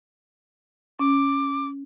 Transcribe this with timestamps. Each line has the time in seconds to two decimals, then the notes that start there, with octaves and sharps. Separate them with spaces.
0.99 C#4 D6